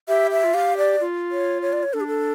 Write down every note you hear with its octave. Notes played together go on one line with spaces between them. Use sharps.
G4 E5
E5
F4
G4 F5
D5
F4
C#5
C#5
D5
C#5
D4 A4
G4
A4